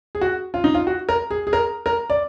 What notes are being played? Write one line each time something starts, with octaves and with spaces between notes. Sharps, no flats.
G#4
F#4
F4
D#4
F4
F#4
A#4
G#4
G#4
A#4
A#4
D5